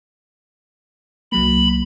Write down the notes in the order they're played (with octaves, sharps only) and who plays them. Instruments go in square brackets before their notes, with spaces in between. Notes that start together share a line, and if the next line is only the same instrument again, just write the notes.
[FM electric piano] C2 F#3 A#3 [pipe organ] B5